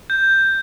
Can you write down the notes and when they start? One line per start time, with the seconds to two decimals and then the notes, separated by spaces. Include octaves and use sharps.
0.10 G6